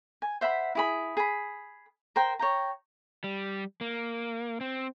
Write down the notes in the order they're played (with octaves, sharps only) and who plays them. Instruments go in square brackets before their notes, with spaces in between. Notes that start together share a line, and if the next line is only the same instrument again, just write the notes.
[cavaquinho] G#5
C5 E5 F#5 B5
E4 G#4 B5
G#4 B5
A#4 C5 G5
C#5 G5 A#5
[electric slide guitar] G3
A#3
C4